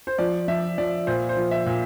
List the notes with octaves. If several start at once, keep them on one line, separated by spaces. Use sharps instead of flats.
C5
F3 D5
F3 E5
F3 D5
A#2 C5
C5
F3
E5
A#2